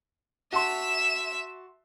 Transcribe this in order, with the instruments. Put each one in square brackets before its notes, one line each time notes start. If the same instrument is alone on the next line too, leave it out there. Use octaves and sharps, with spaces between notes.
[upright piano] F#4 A5 C6 [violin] E5 E7